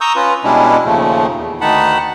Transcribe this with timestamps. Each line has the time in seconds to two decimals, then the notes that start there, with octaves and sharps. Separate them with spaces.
0.01 A#5 C#6 D#6 E6 G6
0.16 C#4 F4 B4
0.44 B2 G3 G#3 C#4 D4 E4
0.85 D#2 A#2 C#3 F3 A3
1.35 E2
1.61 D2 D#3 D#4 F#5 A5 B5